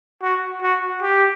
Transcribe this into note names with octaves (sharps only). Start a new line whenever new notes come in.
F#4
F#4
G4